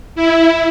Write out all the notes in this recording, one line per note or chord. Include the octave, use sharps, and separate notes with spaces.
E4